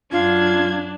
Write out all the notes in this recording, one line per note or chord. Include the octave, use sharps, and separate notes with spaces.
F#2 D4 F4 G#6